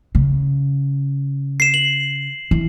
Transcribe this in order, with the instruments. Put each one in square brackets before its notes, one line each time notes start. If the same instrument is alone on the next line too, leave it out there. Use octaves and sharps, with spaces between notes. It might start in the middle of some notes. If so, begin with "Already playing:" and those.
[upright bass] C#3
[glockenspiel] C7 E7
F#7
[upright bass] E3